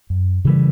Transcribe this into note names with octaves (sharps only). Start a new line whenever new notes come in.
F#2
C#3 E3 G3